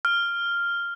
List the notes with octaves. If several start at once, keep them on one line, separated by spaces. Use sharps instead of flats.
F6